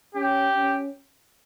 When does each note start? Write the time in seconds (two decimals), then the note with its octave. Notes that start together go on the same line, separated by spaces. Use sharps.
0.15 C#4 G4
0.56 C#4